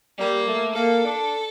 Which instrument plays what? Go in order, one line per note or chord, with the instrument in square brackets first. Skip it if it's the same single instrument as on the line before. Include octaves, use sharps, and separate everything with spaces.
[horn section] G3 [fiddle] A#3
[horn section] A3
[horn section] A#3 [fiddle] A4
[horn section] D4